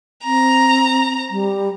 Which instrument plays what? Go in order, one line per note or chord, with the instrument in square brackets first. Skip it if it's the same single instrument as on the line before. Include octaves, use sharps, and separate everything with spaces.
[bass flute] C4 [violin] A#5
[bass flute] G3